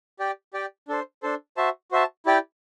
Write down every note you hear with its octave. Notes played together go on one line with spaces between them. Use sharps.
G4 D5 G5
G4 D5 G5
D4 A4 C5
D4 A4 C5
F#4 C5 E5 A5
F#4 C5 E5 A5
E4 G4 D5 G5